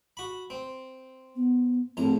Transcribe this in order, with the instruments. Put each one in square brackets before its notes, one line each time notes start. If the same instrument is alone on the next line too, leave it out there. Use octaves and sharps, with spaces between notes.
[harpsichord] F#4 B5
C4
[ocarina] B3
[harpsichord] A#1 A2 A#5 [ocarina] C4